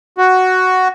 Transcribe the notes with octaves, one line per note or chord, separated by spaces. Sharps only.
F#4